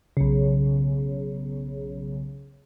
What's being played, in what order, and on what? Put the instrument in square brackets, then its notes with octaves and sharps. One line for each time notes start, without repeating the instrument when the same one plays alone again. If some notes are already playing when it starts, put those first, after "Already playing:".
[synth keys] B1 C#3